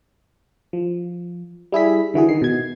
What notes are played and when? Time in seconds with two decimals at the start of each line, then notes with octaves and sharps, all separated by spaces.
0.73 F3
1.72 G3 E4 G#4 B6
2.14 D3 E3 F#4 G#4
2.29 D#3 C7
2.42 B2 G#6